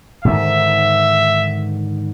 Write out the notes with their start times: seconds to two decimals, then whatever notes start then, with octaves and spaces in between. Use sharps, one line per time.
0.25 G#2 D3 D#3 E5